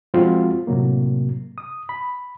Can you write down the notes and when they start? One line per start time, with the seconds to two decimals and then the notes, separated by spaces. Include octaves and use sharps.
0.14 F3 G#3 C4 F4 F#4
0.67 A2 C3 F#3 A#3
1.58 D#6
1.89 B5